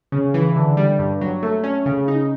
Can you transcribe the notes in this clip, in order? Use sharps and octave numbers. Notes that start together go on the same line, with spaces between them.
C#3
E3
D3
G3
G2
F#3
A3
C#4
C#3
D#4